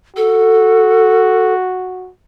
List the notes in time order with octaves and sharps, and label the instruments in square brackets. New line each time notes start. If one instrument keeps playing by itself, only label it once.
[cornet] F#4 [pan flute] A4